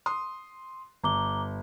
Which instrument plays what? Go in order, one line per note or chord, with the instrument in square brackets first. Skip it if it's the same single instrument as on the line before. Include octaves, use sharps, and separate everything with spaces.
[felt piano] C6 D#6
[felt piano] G1 [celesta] A#5 D6 G7